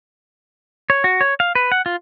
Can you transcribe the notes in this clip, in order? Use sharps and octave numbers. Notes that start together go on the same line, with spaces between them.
C#5
F#4
C#5
F5
B4
F#5
F4